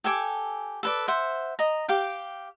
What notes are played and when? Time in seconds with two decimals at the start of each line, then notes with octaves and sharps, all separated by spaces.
0.04 G4 A4 G#5 D6
0.83 A4 B4 D5
1.08 C5 E5 F#5
1.59 D#5 A#5
1.88 G4 F5 G5